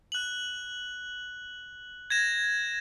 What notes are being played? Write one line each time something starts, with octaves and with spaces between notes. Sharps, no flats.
F#6 F#7
G#6 A#6 E7